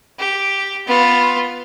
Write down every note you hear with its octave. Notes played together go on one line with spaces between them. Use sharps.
G4
B3 F4